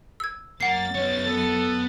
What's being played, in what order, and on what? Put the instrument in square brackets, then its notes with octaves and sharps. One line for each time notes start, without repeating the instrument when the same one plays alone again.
[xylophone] E6 G#6
[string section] F#2 A6 [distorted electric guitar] A#3 [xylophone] F#5 C7
[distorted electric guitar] B3 C#5
[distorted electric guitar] B3 [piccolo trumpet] A4